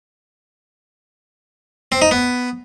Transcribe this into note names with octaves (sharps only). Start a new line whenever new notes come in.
C4
D#4
B3